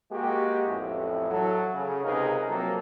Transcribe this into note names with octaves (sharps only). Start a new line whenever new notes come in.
G#3 A#3 F#4 G4
A1 F2 E4
F#3 A4
C#3
C#2 C3 D#4 G#4 A#4 B4
F3 F#3 A#3 C4 A4 A#4